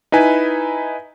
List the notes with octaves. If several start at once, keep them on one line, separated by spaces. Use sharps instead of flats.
D#4 E4 B4 G#5